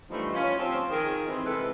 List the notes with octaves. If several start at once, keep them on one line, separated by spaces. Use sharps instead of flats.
E3 F3 G3 A3 D4 D#4
C#4 F4
F3 C4
D#3 G#4 A#4
E3 C4
C3 E3 G#3 A4 B4